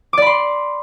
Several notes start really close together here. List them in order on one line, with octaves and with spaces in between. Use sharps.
D6 D5 B5 C6